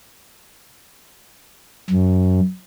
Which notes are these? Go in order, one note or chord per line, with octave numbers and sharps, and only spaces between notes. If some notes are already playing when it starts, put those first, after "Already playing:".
F#2